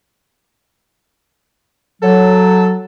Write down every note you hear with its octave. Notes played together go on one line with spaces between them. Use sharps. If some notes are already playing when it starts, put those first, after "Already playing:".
F#3 A4